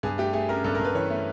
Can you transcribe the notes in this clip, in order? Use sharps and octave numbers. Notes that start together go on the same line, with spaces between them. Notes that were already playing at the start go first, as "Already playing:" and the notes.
G2 G#4
A3 G4
A3 G#4
C#4 A#4
G2 A4
A#4
G2
B4
E3 C#5
A3